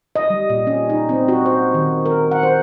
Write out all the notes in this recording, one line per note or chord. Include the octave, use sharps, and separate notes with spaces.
D#5
G3
A#2
C#4
D#4
C4
F#4
C5
D#3
A#4
F#5
C5